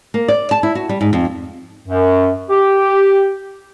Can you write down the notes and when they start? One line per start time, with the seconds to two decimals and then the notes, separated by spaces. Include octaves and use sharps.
0.14 A#3
0.28 D5
0.51 A5
0.63 E4
0.75 F#4
0.89 G3
1.01 G#2
1.13 F2
1.87 F#2
2.49 G4